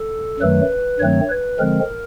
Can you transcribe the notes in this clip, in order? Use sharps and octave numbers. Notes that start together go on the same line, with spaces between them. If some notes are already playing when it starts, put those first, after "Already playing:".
Already playing: A4
F#2 D#3 F#3 A3 B4
G2 D#3 F#3 A3 C4 C#5
B4
D3 F3 G#3 C4 A#4